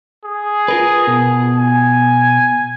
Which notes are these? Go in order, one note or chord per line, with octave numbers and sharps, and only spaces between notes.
G#4
F4 A#4 B4
B2
G#5